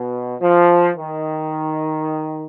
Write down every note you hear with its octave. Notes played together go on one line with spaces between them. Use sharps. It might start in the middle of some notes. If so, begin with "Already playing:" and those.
Already playing: B2
F3
D#3